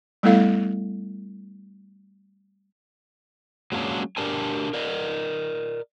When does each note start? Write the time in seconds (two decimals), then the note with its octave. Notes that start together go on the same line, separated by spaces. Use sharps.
0.23 G3 A3 B3 E4 A4 F5
3.72 F#3 G#3 A#3 C#4 D4 G#4
4.17 D4 G4 A#4 D5 G#5 A5
4.73 A#4 D5 D#5